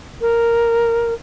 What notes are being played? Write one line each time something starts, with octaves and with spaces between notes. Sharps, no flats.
A#4